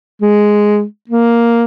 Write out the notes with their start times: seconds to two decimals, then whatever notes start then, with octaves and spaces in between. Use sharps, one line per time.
0.22 G#3
1.10 A#3